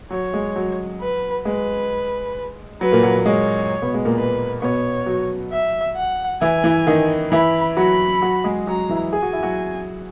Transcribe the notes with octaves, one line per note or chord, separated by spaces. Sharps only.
F#3 C#5
G#3
F#3
B4
G#3 B4
F#3 B4
A#2 A#3
F#3
F#3
G#3 C#5
B2 B3
G#3
A#2 A#3
B4
B2 B3 C#5
F#3 F#4
E5
F#5
E3 E4 G#5
E3 E4
D#3 D#4
E3 E4 B5
F#3 F#4 B5
F#3 F#4
G#3 G#4
F#3 F#4 A#5
E3 E4
G#4 G#5
F#4
E4
F#3 F#4